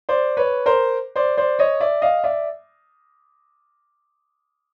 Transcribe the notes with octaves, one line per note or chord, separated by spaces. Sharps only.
C5 D5
B4 C#5
A#4 C5
C5 D5
C5 D5
C#5 D#5
D5 E5
D#5 F5
D5 E5